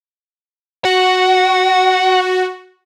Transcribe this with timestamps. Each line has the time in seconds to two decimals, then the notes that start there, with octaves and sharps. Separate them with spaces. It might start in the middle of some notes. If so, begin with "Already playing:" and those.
0.85 F#4 F#5